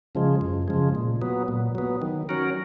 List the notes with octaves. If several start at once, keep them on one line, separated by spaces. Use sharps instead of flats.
C#3 F3 G#3
F#2
C#3 F3 G#3
A#2
F#3 B3
A#2
F#3 B3
D#3
F#3 C#4 F#4 A#4